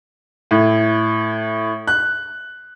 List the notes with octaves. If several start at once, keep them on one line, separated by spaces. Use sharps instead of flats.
A2
F#6